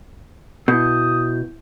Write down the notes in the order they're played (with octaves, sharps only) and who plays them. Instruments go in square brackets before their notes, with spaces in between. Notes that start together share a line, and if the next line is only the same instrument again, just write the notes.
[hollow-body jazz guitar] B2 [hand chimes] E4 G6 [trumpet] D#6